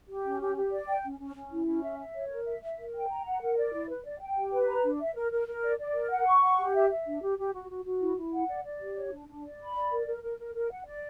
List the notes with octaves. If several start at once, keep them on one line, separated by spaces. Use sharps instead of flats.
G4
C#4
G4
G4
D5
G5
C#4
C#4
C#4
E4
C#4
E5
E5
C#5
A#4
E5
E5
A#4
G5
A#5
F#5
A#4
D5
E4
B4
D5
G5
G4
B4
A#5
D4
E5
A#4
A#4
A#4
D5
D5
A#4
F#5
C#6
F#5
G4
E5
E5
D4
G4
G4
F#4
F#4
F#4
E4
E4
F#5
D5
D5
G4
C#5
D4
D4
D5
B5
D5
A#4
A#4
A#4
A#4
A#4
F#5
D5